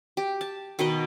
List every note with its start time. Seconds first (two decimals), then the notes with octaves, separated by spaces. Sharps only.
0.17 G4
0.41 A5
0.79 B2 D#3 B4 D#5